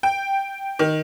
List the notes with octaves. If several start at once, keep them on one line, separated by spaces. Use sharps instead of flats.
G5
D#3